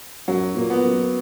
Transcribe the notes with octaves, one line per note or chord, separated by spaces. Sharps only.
F#2 F#3
A#2 A#3
B3
F#2